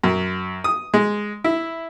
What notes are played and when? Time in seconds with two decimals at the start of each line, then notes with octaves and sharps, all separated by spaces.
0.04 F#2
0.64 D#6
0.94 G#3
1.44 E4